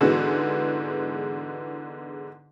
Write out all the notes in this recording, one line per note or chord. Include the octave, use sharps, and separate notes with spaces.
G#2 D3 E3 G#3 B3 F#4